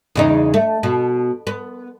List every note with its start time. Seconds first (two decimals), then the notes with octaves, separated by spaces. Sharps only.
0.15 E2 C#3 D#4
0.54 A3
0.83 B2
1.47 B3